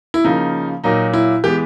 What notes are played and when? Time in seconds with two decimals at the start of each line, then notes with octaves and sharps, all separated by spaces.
0.14 E4
0.24 C#3 F3 A#3 D#4
0.84 A#2 F#3 A#3 D#4
1.13 E4
1.44 E3 G#3 B3 G4